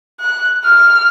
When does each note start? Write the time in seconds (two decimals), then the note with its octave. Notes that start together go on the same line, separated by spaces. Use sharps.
0.20 F#6
0.64 F6